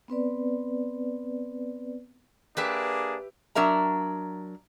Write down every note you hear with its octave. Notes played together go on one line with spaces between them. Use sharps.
B3 C4 B4 D5
A#3 D4 G4 G#4 B4 E5
F#3 D4 A#4 E5 A#5